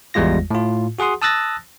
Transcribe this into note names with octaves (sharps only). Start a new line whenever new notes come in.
G#1 E2 G3 G#3 F4 A#6
A2 F4
F#4 G#4 F#5 C6 D#6
A5 D#6 E6 F#6 A6 A#6